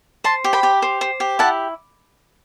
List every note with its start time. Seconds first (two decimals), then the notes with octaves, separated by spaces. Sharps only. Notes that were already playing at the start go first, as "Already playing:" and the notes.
0.24 C5 A5 C6
0.44 G4
0.53 G5 B5
0.63 G4
0.82 C5
1.01 C5
1.20 G4
1.39 E4 F#5 A5